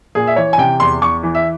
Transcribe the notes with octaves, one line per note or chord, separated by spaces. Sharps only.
A#2 G#4
E5
E3 C#5
G#5
C3 G5
E2 C6
E2 C#6
E3
E5